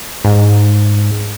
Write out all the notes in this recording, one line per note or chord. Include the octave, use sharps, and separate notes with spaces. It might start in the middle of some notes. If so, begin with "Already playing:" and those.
G#2